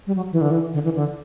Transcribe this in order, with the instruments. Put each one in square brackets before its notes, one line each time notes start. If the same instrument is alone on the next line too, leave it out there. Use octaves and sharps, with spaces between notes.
[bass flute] G3
F#3
E3
D3
E3
D3
E3
D3